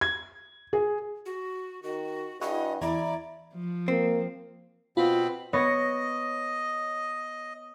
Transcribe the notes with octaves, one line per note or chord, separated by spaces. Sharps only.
G#6
G#4
F#4
D#3 F#4
G2 E4 F#4 G#4 D#5
E2 E4 D5 A#5 G#6
F3
A#3 C4
B2 C4 F4 B5
B3 C#5 D#5 A#6